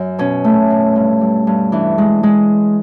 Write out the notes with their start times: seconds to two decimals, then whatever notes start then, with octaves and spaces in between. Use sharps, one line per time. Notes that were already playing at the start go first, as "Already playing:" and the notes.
Already playing: F#2
0.19 B2 C#4
0.44 A3
0.70 B2
0.96 G2
1.21 G3
1.47 G2
1.72 E3 D4
1.98 G#3
2.23 G#3